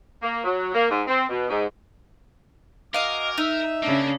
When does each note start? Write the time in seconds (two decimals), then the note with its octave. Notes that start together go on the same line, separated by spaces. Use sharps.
0.22 A#3
0.44 F#3
0.74 A#3
0.90 G#2
1.08 C4
1.30 B2
1.49 G#2
2.94 F#4 A#4 D#5 F5 G#5 D6
3.38 D#4 E5
3.83 C#3 A#3 D4